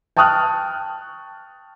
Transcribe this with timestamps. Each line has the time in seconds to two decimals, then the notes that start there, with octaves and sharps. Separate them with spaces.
0.17 G5 A5 C#6 D#6 F6 F#6